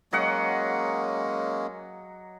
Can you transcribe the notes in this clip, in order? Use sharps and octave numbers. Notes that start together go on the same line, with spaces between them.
F#3 G#3 A#3 C#4 D#5 F#5